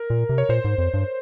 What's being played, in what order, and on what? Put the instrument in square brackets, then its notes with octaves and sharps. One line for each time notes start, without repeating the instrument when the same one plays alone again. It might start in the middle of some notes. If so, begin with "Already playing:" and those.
Already playing: [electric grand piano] A#4
[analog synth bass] A#2
C3
[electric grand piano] C#5
[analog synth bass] A#2 [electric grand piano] C5
[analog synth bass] G#2
F2
G2